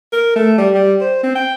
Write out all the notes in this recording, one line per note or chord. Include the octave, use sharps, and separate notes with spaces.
A#4
A3
G3
G3
C5
C4
G5